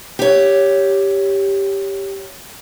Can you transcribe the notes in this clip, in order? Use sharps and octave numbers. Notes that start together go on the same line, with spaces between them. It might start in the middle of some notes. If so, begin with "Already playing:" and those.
G4 C#5